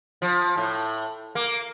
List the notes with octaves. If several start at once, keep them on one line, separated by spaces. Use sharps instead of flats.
F3
A2
A#3